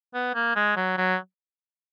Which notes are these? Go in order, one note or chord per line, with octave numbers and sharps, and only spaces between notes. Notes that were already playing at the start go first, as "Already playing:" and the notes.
B3
A#3
G#3
F#3
F#3